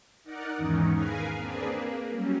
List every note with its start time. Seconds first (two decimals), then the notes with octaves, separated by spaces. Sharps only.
0.24 D#4 A#4 D5 F#5
0.57 E2 G#2 D#3 E3 C#4 D#4
0.92 G#4 A#4 B4 F5 G#5
1.37 A#3 C4 D4 G#4 B4
1.68 A#3
2.09 F#3 G3 C#4